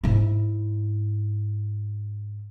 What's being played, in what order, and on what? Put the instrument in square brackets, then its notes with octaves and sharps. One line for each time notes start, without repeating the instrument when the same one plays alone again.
[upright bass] G#2 E4